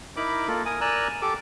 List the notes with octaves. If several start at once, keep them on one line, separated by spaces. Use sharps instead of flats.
D#4 E4 A#4 B5 D6
A#3 F4 A4 A#4
A#4 G#5 D#6
A#4 D5 G#5 A#5 E6 F#6
G4 A4 D6